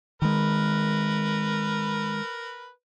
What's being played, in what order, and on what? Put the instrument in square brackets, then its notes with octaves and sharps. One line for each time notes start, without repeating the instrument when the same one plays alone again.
[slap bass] D#3 G#3 [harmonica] A#4 B4